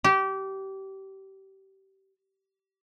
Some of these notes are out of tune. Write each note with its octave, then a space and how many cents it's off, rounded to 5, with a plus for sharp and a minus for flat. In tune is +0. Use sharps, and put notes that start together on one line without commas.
G4 -25